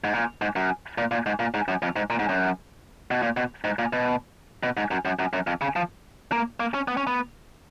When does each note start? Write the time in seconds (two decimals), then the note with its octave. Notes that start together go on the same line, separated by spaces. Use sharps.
0.04 G#2
0.13 A#2
0.42 G#2
0.56 F#2
0.98 A#2
1.11 A#2
1.26 G#2
1.40 A#2
1.54 G#2
1.68 F#2
1.82 F2
1.96 G#2
2.10 A#2
2.19 G#2
2.29 F#2
3.11 B2
3.22 A#2
3.37 B2
3.64 G#2
3.79 A#2
3.93 B2
4.63 B2
4.77 G#2
4.91 F#2
5.05 F#2
5.19 F#2
5.33 F#2
5.47 F2
5.61 C#3
5.76 F3
6.32 A#3
6.60 A#3
6.74 C#4
6.88 B3
6.97 C#4
7.07 B3